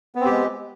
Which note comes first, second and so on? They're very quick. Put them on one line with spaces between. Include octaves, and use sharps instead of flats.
B3 C4 G4 G#3